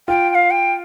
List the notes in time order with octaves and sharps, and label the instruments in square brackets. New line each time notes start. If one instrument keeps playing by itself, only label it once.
[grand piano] F4 [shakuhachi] G5
[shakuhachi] G5
F5
G5